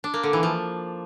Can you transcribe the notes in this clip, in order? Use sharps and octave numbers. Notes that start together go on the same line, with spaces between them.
D4
A#3
D3
E3
F3